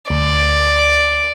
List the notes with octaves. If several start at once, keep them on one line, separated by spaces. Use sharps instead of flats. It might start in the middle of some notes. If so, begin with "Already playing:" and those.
D2 D5